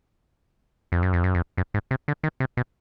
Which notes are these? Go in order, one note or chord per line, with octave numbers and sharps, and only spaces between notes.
F2
F#2
F2
F#2
F2
F#2
G#2
C3
D3
D#3
C3
B2